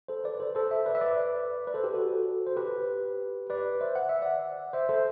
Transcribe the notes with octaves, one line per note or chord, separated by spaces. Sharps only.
A4 C5
B4 D5
A4 C5
A4 C5
C5 E5
B4 D5
E5
B4 D5
B4
A4 C5
G4 B4
F#4 A4
C5
G4 B4
B4 D5
C5 E5
F#5
E5
D5 F#5
C5 E5
A4 C5